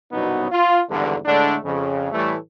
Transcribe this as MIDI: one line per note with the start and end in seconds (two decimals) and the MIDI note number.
0.12 0.50 36
0.12 0.50 42
0.12 0.50 47
0.12 0.50 54
0.12 0.50 59
0.12 0.50 63
0.51 0.82 65
0.90 1.16 32
0.90 1.16 40
0.90 1.16 43
0.90 1.16 50
1.25 1.57 45
1.25 1.57 50
1.25 1.57 56
1.25 1.57 57
1.25 1.57 62
1.64 2.09 41
1.64 2.09 49
2.12 2.35 45
2.12 2.35 52
2.12 2.35 55
2.12 2.35 57